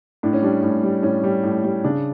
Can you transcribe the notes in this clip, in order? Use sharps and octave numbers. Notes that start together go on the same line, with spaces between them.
A2 D4
C#4
G3 D4
A2
G3
A2 C#4
G3
A2
G3
C#3 D4